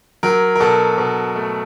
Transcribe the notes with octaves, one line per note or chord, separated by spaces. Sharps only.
F#3 A#4
A#4
B2 A4
B2
A3